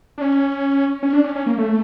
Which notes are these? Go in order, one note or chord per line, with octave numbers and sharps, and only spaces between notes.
D4
C#4
C#4
D4
C#4
C#4
A#3
A3